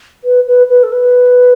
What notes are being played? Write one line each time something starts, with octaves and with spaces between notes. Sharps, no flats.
B4
B4
B4
A4
B4